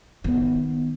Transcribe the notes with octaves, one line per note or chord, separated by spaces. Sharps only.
D#3 B3